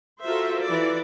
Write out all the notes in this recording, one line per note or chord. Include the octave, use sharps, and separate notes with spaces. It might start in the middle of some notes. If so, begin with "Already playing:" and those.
F4 F#4 A4 A#4 C5 E5
E3 D5